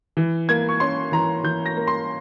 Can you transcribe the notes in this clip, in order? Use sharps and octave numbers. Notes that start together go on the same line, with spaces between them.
E3
A#3 G#6
C#6
C#4 C6
E3 A#5
E3 G6
A#6
A#3
C6